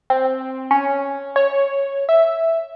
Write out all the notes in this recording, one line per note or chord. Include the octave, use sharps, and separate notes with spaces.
C4
C#4
C#5
E5